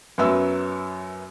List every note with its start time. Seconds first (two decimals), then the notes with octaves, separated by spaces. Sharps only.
0.18 F#2 F#3 B3 E5 E6